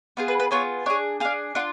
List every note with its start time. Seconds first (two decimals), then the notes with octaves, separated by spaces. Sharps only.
0.17 B3 F4 G#4
0.28 B4
0.40 B4
0.51 B3 F4 G#4 C#5
0.86 D4 G#4 C#5
1.20 D4 G#4 F5
1.55 D4 F4 F#5